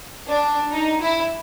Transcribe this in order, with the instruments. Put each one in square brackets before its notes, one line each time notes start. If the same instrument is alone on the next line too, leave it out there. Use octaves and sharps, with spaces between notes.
[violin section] D4
D#4
E4